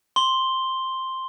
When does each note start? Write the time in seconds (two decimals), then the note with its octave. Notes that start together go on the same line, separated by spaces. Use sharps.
0.16 C6 G7